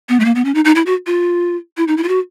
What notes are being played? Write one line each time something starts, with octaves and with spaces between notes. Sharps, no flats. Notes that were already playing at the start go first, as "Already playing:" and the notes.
B3
A3
A#3
B3
C#4
D#4
D#4
E4
F#4
F4
E4
D#4
E4
F4
F#4